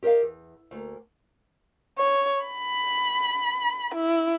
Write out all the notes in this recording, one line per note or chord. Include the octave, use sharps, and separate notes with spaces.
G4 A#4 B4 D#5 F5
E2
D2 A#3
C#5
B5
E4